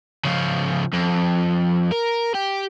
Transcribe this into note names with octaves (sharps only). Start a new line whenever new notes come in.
C#3 F3
F2
A#4
G4